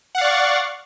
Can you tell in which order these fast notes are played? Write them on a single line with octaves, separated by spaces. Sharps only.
F#5 F5 D5 C#6